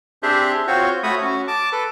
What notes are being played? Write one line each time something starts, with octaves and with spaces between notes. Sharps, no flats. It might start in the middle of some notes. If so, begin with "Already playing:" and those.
C4 D4 G4 G#4 C5 E5
C4 F4 F#4 C5 C#5
A3 F#4 C#5 B5 D#6
C#4 F#4
A5 D6
A4 B4